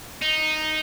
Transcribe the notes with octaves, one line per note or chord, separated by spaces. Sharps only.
D#4